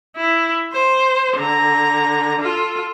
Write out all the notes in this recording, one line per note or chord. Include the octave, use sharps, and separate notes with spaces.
E4
C5
D3 A#5
F4 A4